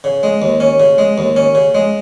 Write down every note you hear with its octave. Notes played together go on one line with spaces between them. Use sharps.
C#3
G#3
D#2
C#4
C#3
G#3
D#2
C#4
C#3
G#3